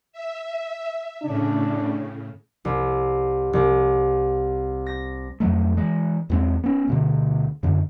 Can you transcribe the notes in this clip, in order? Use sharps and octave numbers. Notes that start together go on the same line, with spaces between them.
E5
A2 C#3 D4
C2
C2
A#6
F2 F#3 A3
E3 G#3
E2 G2 G#3 C4
B3 C#4
D2 B2 D3
F#2 D3